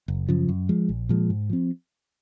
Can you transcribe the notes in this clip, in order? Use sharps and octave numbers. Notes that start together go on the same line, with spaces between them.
F#1
F#2 C#3 F3
F#2
F3 G#3
A#1
A#2 F3 G#3
G#2
F3 C4